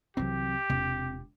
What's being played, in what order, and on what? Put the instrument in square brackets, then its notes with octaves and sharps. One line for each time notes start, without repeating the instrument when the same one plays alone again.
[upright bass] C2 E3 [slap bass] F#3 C4 [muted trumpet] G4
[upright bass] E1 F4 [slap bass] C3